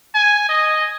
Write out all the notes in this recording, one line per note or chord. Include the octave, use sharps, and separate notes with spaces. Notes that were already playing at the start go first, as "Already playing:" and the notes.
G#5
D#5